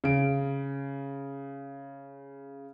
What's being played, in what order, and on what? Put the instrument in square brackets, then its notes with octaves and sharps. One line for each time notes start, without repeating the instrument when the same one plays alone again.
[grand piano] C#3 D7